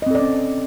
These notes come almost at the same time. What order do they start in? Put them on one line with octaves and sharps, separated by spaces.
D#5 C4 A4 D5 C#4